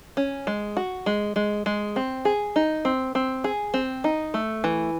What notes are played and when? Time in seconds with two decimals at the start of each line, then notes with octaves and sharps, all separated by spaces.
0.17 C#4
0.47 G#3
0.77 F#4
1.06 G#3
1.36 G#3
1.66 G#3
1.96 C4
2.25 G#4
2.56 D#4
2.85 C4
3.15 C4
3.44 G#4
3.74 C4
4.04 D#4
4.34 A3
4.64 E3